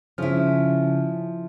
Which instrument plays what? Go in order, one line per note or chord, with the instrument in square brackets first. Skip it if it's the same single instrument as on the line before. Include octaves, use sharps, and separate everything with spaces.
[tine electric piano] C#3 C#4 F6 [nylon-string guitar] F3 E4